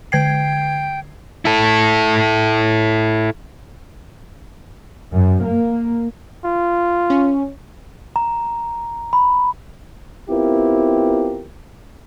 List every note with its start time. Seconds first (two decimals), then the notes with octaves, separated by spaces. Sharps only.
0.12 D3 G5 G#6 C7
1.45 E4 A4
5.14 F#2
5.46 A#3
6.45 F4
7.10 C#4
8.16 A#5
9.13 B5
10.30 B3 C4 E4 F4 G4 A#4